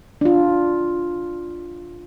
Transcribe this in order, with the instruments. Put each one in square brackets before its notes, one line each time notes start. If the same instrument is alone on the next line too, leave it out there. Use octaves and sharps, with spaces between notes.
[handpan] D4 F4